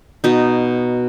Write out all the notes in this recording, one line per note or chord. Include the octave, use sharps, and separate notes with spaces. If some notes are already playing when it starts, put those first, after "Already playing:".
B2 D#4